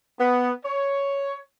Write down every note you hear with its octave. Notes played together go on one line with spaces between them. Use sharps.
B3
C#5